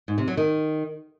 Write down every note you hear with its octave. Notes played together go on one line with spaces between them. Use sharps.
G#2
C3
F#3
D#3